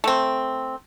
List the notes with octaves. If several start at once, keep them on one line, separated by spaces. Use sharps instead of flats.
A3 C4